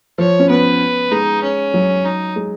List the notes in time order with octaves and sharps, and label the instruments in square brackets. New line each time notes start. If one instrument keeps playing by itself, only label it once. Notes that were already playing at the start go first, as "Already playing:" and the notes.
[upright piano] F3 [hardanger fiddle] C#5
[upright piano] C#4
[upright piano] B3 [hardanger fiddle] B4
[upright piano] G#3 [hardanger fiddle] D#4
[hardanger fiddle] C#4
[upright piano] F#3
[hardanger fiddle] D#4
[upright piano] G#3